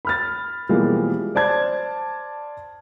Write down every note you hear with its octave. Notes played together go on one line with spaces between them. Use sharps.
B5 F6 A6
B2 E3 F3 G3 G#3 A#3
C5 D5 A5 G#6